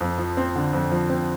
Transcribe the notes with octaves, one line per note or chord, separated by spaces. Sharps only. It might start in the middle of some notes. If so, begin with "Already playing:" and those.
F2
F3
C4
D3
F2
F3
C4